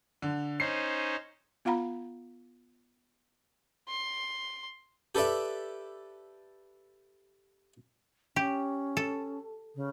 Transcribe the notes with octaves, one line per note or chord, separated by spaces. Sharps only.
D3
C#4 D#4 C5 C7
B3 F4 F5 F#5 A#5 B5
C6
G4 A4 B4 D5 E5
C#4 G4
A4
C#3